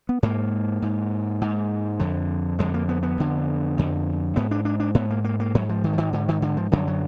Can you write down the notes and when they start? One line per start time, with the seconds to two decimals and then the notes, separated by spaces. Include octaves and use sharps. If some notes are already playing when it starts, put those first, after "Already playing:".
0.09 B3
0.23 G#2 A#3
0.82 G#2
1.41 G#2
2.00 F2 D3
2.59 F2 D3 G#3
2.74 A#3
2.89 B3
3.03 B3
3.18 F2 D3
3.78 F2 D3
4.36 G#2 B3
4.51 D4
4.65 D4
4.80 D4
4.95 G#2 B3
5.10 A#3
5.24 A#3
5.40 A#3
5.55 G#2 F#3
5.69 F3
5.84 D#3
5.93 F3
5.98 D#3
6.13 G#2 D3
6.29 D#3
6.42 D3
6.57 F3
6.72 F#2 D3 F#3
6.88 F#3